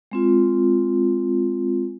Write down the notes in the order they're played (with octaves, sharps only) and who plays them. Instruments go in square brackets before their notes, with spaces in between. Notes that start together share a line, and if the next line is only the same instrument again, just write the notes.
[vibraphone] G#3 C4 F4